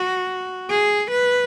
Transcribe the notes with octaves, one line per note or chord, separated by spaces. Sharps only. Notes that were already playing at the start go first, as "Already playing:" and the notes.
Already playing: F#4
G#4
B4